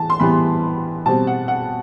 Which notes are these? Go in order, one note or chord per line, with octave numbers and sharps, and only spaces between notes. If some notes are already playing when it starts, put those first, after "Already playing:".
Already playing: E3 A5
C6
E3 G3 B3 B5
B2 G3 C4 A5
F#5
F#5